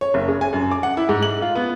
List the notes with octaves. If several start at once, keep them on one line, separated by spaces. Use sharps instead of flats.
C#5
F#1
C#3
G#5
F#2
D6
F#5
E4
G#2
F#7
F4
B3